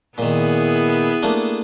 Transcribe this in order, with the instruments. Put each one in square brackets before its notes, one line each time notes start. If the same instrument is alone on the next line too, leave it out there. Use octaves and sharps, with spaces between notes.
[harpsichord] A#2 D#3 [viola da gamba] B3 E4 G#4
[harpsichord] A3 A#3 D4